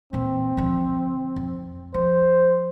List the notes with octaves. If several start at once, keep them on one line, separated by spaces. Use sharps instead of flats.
A#2 E3 C4
D3 F3
F2
F3 C5